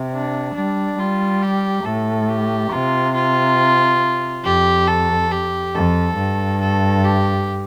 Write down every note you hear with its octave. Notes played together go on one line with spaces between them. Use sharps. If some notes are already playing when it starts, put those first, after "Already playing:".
Already playing: C3
D4
G3 D4
G3 F4
G4
A2 A4
G4
C3 F4
F4
F2 G4
A4
G4
F2 A4
G2
A4
G4